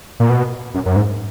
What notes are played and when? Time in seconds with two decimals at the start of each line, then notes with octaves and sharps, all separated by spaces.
0.20 A#2
0.29 B2
0.75 F#2
0.86 F#2
0.96 G#2